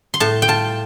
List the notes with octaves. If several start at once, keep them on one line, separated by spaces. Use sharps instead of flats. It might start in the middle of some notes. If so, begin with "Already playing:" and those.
C6
A2 A5
G5
F4 A5